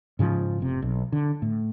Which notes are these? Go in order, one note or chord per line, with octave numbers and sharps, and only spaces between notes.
G#2 C#3 E3 F3
F1 C3
B1
D3
A2